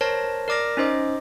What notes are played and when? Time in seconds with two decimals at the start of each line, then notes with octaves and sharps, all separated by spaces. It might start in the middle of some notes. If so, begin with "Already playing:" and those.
0.01 A#4 C5 C#5 A5 A#6
0.48 A#4 D5 D6 F6 A#6
0.77 C#4 D#4 C5 D#5 D6